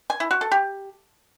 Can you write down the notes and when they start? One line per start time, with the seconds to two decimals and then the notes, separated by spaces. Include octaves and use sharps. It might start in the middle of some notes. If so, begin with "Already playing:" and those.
0.10 G#5
0.20 E4
0.31 F#4
0.41 A4
0.52 G4